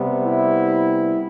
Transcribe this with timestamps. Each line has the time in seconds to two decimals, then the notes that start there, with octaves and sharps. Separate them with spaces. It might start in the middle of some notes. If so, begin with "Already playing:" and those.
Already playing: C3 G3 B3
0.23 E4